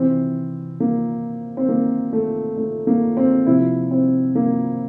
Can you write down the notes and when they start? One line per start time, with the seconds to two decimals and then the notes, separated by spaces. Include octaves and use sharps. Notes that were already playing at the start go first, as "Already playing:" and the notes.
Already playing: C3 E3 C4
0.80 A#3
1.57 C4
1.69 A#3
2.13 A3
2.57 A3
2.87 A#3
3.17 C4
3.46 C3 F3 E4
3.91 C4
4.35 A#3